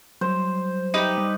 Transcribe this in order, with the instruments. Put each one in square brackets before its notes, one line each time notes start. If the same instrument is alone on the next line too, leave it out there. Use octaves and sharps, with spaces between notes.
[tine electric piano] F#3 G3 [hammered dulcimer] C5
[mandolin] D#4 G4 B4
[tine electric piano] G3